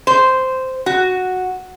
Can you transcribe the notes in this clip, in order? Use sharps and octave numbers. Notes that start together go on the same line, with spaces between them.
C5
F#4